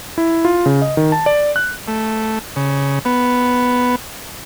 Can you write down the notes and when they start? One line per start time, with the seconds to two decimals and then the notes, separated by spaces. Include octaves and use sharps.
0.18 E4
0.45 F4
0.66 C#3
0.82 D#5
0.97 D#3
1.12 A5
1.26 D5
1.56 F#6
1.88 A3
2.56 C#3
3.05 B3